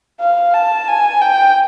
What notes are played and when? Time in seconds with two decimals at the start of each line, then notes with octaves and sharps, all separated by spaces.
0.20 F5
0.54 A5
0.88 G#5
1.21 G5